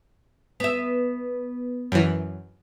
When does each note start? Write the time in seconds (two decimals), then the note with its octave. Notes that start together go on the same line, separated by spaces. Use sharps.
0.60 B3 E5
1.92 F#2 E3